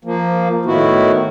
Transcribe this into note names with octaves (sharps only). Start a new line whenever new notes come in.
F3 A#3
A2 D#3 B3 E4 F#4